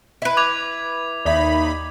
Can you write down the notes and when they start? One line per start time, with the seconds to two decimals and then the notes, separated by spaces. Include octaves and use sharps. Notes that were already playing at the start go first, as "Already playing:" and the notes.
0.22 E4 B4
0.37 D6 G#6 F7
1.25 D#2 D#4 D5 E5 B5